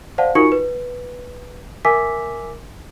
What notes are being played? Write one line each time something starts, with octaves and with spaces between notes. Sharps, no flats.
C5 D5 F5 F#5 A5
D#4 F4 F#4 A#4 C#6 C#7
B4
A#4 E5 G#5 D6 E6 B6